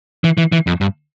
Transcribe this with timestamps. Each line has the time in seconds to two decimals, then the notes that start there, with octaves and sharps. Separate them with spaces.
0.24 E3
0.38 E3
0.52 E3
0.67 F2
0.81 G2